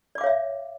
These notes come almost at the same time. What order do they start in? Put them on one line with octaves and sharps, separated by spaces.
D5 D6 F5 C#5 E5